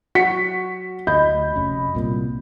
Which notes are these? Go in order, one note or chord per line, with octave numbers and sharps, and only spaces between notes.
F#4 B6 C#7
D2 D#5 B5 G6
F1 C#4
C2 A#2